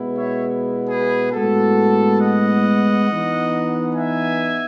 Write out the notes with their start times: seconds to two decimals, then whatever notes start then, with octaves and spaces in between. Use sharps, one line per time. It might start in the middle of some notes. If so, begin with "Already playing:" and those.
Already playing: B2 G#3 B3 E4
0.16 C#5 E5
0.89 G#4 B4
1.32 A2 G#3 B3 F#4 A4
2.20 D#5 F#5
3.07 E3 B3 D#4
3.94 E5 G#5